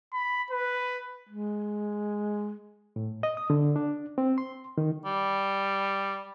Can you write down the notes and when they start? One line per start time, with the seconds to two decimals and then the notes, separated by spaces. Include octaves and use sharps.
0.13 B5
0.50 B4
1.29 G#3
2.96 A2
3.23 D#5
3.37 D#6
3.50 D3
3.76 D4
4.18 C4
4.38 C6
4.78 D#3
5.05 G3